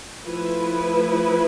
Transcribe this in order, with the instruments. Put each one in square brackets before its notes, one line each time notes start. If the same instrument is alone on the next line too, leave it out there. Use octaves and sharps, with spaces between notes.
[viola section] F3 A3 E4 B4